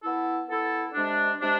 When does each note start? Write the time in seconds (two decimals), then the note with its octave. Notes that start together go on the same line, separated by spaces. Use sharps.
0.02 B3 E4 A4
0.49 B3 E4 A4
0.94 C3 G#3 D4
1.40 C3 G#3 D4